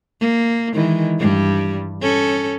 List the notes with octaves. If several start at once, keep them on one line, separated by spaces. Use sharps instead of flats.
A#3
D#3 E3 G#3
G2 G3
C#4 A4